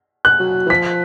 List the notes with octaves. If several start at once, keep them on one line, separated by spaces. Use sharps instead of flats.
F#6
F#3
E3
F3 B6